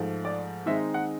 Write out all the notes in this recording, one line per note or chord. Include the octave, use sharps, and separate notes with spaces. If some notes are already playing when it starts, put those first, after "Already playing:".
Already playing: G#2 F3 A3
D5
D#3 G#3 C4 D#4 E5
F#5